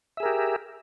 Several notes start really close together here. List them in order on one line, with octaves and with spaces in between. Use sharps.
E5 G#4 A#4 G4